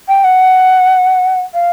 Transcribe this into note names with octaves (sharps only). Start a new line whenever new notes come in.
G5
F#5
F5